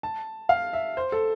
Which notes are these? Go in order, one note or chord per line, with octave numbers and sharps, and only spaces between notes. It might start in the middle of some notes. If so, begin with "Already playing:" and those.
A5
F5
E5
C5
A4